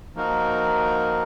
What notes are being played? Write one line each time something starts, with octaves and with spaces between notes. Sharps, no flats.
F3 A#3 D#4 F#4 A#4